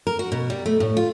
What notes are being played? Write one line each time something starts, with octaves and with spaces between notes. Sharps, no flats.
A#4
F#4
B2
G3
A3
A2
F4